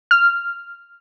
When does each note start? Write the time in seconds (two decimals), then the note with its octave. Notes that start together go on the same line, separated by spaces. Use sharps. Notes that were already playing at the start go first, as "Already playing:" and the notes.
0.11 F6